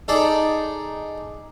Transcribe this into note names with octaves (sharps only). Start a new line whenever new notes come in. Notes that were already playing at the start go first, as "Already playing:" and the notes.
D#4 G#4 A4 D5